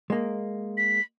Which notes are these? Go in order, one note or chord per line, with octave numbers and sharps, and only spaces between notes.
G#3 A#3
B6